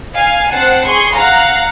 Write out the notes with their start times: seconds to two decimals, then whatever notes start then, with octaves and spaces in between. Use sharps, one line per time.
0.15 F5 G#5
0.50 C4 F#5 A5 C7
0.86 G#4 C6 C#6
1.16 F5 F#5 A#5